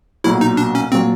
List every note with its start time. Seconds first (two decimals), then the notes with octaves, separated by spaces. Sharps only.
0.24 B1 A#2 F#3 E4
0.41 D#4
0.57 D4
0.75 C#4
0.92 A#2 F#3 C4